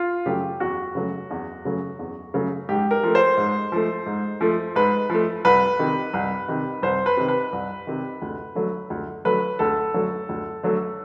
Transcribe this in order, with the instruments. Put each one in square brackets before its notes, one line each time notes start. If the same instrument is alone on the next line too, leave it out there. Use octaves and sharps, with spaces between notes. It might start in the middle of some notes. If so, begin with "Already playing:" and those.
Already playing: [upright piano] F4
C#3 F#3 A3 G4
E2 F#4
C#3 F#3 A3
E2
C#3 F#3 A3
E2
C#3 F#3 A3
G#2 G4
A#4
F3 A3
C5
G#2
F3 A3
G#2
F3 A3
G#2 B4
F3 A3
C2 B4
C3 D#3
C2
C3 D#3
C2 C5
B4
C3 D#3
B4
C2
C3 D#3
D2
D3 F#3 A3
D2
D3 F#3 A3 B4
D2 A4
D3 F#3 A3
D2
D3 F#3 A3